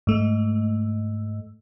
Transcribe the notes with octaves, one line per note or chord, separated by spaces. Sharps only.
G#2 A3